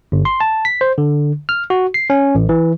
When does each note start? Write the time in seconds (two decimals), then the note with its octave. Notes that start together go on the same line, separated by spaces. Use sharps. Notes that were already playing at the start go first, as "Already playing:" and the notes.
0.12 G1
0.25 C6
0.40 A5
0.65 B6
0.81 C5
0.98 D3
1.49 F6
1.70 F#4
1.94 C7
2.10 C#4
2.35 A1
2.49 E3